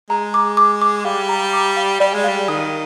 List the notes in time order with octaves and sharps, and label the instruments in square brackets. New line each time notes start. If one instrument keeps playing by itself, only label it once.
[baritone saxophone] G#3 [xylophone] A#5
[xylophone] D6
D6
D6
[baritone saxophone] G3 [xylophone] F5
[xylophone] A#5
D6
F5
[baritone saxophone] G3 [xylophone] D5
[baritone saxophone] G#3
[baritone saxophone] G3 [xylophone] F5
[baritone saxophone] D#3 [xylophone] D#6